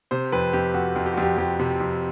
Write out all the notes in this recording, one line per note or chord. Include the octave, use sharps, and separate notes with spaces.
C3 C5
F2 B4
F2 G4
F2 F#4
F2
G4
F#4
F2 G4
F2 G4
C3
F2